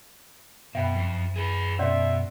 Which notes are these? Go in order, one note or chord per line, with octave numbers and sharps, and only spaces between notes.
F#2 B2 E5 G5 B5
F2
G#4 B4
B2 C#4 D5 E5 C6